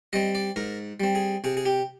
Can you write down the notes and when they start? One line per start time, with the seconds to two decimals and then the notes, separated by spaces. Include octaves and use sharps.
0.13 G3 C4 D#5
0.35 D5
0.56 G#2 A#4
1.00 G3 C4
1.15 G#4
1.44 C3 G#4
1.57 G#4
1.66 G4